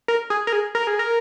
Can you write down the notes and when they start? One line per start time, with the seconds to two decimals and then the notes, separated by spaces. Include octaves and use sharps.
0.08 A#4
0.30 G#4
0.47 A#4
0.53 G#4
0.75 A#4
0.87 G#4
0.99 A#4